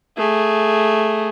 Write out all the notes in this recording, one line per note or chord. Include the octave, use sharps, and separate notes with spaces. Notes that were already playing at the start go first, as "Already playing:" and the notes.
A3 G#4